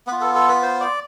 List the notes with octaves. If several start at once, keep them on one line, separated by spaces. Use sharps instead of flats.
B3 F4 B4
A4
A4
B4
C5
D5